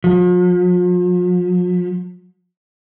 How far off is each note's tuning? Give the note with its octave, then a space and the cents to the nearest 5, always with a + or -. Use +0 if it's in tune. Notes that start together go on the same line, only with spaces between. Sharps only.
F3 +45